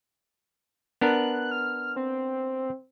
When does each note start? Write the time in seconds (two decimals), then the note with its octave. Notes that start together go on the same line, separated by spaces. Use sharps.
1.01 B3 D4 A#4 F#6
1.51 F6
1.96 C4